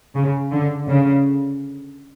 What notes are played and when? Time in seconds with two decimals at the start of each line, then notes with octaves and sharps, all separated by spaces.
0.15 C#3
0.52 D3
0.88 C#3